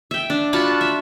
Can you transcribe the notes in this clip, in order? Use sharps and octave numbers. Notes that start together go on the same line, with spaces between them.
E5 G5
D4
F4 F#4 A5 B5
E5